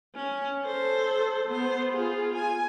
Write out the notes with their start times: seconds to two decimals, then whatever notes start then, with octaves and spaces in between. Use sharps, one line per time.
0.15 C#4
0.65 A4 C5
1.48 B3 C5
1.93 F4 G#4
2.36 G#5